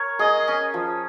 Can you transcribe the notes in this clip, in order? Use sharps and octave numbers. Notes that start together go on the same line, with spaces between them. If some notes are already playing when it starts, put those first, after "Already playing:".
Already playing: A#4 C#5
G#4 D#5
C#4
F3